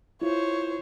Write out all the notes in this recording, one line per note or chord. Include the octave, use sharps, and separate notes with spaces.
E4 F4 C5 C#5